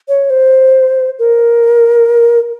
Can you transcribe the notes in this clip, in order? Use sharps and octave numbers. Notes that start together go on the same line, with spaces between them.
C#5
C5
A#4